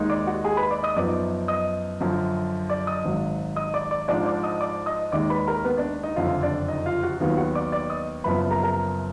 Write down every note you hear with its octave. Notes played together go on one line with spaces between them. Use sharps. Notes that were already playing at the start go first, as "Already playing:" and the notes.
Already playing: D#2 D#3 G#3 D#4
D5 D6
F#4 F#5
G#4 G#5
B4 B5
D5 D6
D#5 D#6
F#2 F3 B3 D#4 D5 D6
D#5 D#6
F#2 D3 F3
D5 D6
D#5 D#6
G#1 G#2 F#3
D#5 D#6
D5 D6
D5 D6
G#2 F3 G#3 D4 D5 D6
D5 D6
D#5 D#6
D5 D6
D#5 D#6
D#2 D#3 G#3 D5 D6
B4 B5
A#4 A#5
B3 B4
D4 D5
D#4 D#5
F#1 F2 D3 F4 F5
D4 D5
D#4 D#5
F4 F5
F#4 F#5
D#2 D#3 F#3 B3 F4 F5
F#4 F#5
D5 D6
D5 D6
D#5 D#6
F#1 F#2 F3 B3 B4 B5
A#4 A#5
A#4 A#5